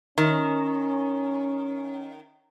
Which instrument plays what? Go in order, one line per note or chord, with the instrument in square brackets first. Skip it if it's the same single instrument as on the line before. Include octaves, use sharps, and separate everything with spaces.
[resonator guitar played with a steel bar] D#3 [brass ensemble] C#4